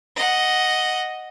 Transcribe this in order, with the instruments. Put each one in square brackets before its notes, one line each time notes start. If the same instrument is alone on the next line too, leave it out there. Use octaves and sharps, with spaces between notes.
[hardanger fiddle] D#5 F#5